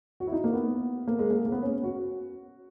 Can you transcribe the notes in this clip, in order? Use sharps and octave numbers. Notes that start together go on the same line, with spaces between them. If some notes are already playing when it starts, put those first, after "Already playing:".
F#4
E4
D#4
A#3
B3
A#3
G#3
A#3
A#3
B3
C#4
F#4